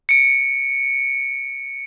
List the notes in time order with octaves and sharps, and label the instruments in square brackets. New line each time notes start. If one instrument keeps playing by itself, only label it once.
[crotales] C#7 D7